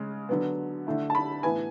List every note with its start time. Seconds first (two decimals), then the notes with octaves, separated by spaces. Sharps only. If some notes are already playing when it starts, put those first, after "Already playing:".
Already playing: C#3 G#3 C#4
0.29 D3 F#3 B3
0.87 D3 A3 E4
1.10 A5
1.15 B5
1.43 A2 E3 B3 G#5